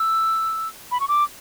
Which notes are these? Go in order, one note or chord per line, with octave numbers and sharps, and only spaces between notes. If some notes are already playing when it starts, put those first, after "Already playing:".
Already playing: E6
B5
C#6
D6